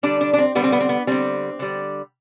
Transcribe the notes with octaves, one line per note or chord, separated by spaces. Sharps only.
D3 G3 D4
D4
D4
C4
D3 G3 B3
C4
B3
C4
B3
D3 G3 C4
D3 G3